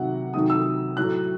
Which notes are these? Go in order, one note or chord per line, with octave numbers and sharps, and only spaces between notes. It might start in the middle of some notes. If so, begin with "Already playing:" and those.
Already playing: C3 D#3 F#3 F#5
C3 D#3 F#3 D#6
E6
A2 F#3 F#6